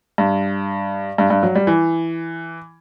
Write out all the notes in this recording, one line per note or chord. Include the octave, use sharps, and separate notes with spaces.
G2
G2
G2
F#3
G3
E3